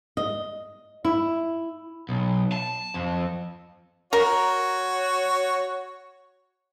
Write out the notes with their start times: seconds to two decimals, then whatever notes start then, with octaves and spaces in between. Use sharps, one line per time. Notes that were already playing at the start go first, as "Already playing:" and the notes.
0.17 D#5
1.05 E4
2.09 B1
2.52 A5
2.94 F2
4.13 F#4 A#4 C#5